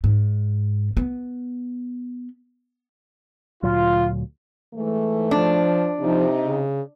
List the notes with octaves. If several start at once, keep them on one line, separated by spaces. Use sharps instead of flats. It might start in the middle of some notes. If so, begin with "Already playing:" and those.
G#2
B3
D2 A#2 F#3 F4
G#2 E3 A3
F3 D4
C3 F3 D#4
C#3